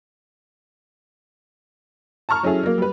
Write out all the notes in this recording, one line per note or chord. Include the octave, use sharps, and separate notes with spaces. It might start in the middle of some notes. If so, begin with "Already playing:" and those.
A5 A#5 C#6 F6
F#3 C#4 E4 G#4 A4
F#3 A#3
G3 B4